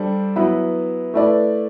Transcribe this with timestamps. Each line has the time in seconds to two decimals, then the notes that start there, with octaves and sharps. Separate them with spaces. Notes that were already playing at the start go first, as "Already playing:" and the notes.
Already playing: G3 D4 A4 C5
0.36 F#3 B3 E4 B4
1.14 A3 E4 B4 D5